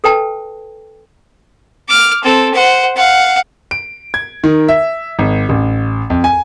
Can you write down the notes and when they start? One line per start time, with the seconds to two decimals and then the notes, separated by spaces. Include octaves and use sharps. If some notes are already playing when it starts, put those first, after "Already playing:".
0.04 A4 B4 G5 A5
1.88 D6 F6
2.23 C4 A4
2.54 C5 F#5
2.96 F5 F#5
3.71 D7
4.14 G#6
4.44 D#3
4.69 E5
5.19 G#1
5.49 A1
6.10 F2
6.24 G#5